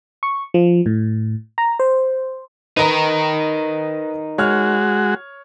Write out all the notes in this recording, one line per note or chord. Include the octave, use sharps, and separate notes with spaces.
C#6
F3
A2
A#5
C5
D#4 A#4 B4 D#5 A#5
G#3 F#4 C#5 F6